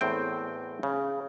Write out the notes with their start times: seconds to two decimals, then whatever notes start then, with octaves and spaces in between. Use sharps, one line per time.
0.01 E2 A2 C4 G5
0.83 C#3